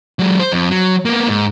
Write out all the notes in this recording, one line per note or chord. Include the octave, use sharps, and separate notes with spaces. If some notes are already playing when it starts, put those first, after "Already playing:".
F#3 G#3
C5
F2
F#3
A#3 B3
G#2